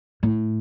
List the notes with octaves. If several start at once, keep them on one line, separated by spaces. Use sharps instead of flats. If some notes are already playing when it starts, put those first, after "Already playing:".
A2